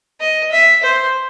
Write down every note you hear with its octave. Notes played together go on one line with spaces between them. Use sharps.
D#5
E5
C5